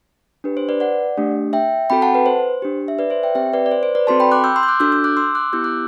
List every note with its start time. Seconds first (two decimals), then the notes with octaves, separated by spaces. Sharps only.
0.44 D4 G4 B4
0.57 C5
0.69 B4 D5
0.80 D5 F#5
1.17 A3 D4 G4
1.53 E5 G5
1.90 C4 F#4 A4 G5 B5
2.02 F#5 A5
2.15 B4
2.26 C5
2.62 D4 G4
2.88 E5
2.99 B4 D5
3.10 C5 E5
3.23 E5 G5
3.35 C4 G4 E5 G5
3.53 B4 D5
3.66 D5
3.71 C5
3.83 C5
3.95 B4 D5
4.07 C4 F#4 A4 A5 C6
4.20 G5 B5
4.32 D6 F#6
4.44 E6 G6
4.56 C6 E6
4.63 G6
4.68 D6 F#6
4.80 D4 F#4 A4 E6 G6
4.92 E6 G6
5.04 D6 F#6
5.17 C6 E6
5.35 D6 F#6
5.53 B3 E4 G4 E6 G6
5.64 D6 F#6